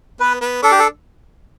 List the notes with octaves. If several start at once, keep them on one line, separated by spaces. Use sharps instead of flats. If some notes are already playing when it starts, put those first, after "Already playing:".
B3 B4
B3
D4 A4
G4
A4